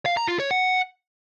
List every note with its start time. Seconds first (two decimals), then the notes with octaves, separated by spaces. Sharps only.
0.06 F5
0.17 A#5
0.28 F4
0.40 C#5
0.51 F#5